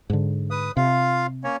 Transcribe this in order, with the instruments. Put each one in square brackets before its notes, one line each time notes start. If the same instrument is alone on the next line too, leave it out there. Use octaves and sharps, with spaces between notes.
[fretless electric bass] G#2 D3
[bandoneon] B4 D#6
[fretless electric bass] C3 [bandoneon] F4 F5
[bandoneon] A#3 C#4 C#5